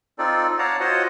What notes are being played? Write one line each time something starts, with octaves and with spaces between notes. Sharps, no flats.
C4 D#4 F4 A4 D5
C#5 D5 F5 F#5 A5 A#5
F4 F#4 C5 C#5 D#5 F#5